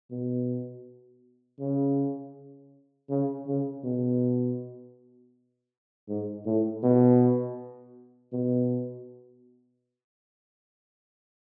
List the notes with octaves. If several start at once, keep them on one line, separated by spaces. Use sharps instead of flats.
B2
C#3
C#3
C#3
B2
G#2
A2
B2
B2